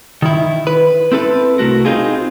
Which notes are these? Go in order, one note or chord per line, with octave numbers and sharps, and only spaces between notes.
D#3 E4
B4
C4 E4 A4 B4
C2 A3 F#4 A#4
C4 D#4 F4 G#4